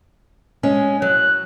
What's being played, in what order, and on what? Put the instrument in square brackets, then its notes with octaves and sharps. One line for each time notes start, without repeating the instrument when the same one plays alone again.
[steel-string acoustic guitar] G#3 C#4
[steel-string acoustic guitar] F#3 [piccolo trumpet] F#6